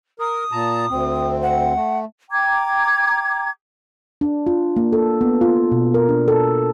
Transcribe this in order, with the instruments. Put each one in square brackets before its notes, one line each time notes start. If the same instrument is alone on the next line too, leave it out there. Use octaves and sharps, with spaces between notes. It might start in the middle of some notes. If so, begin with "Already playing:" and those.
[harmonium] A#4 [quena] D#6
[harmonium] A#2 A5 A#5
D2 C4
[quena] F#5
[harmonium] A3
[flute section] G5 A#5 D6 G#6
[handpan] D4
F4
A#3
A4
B3
F4
B2
A#4
D4
A4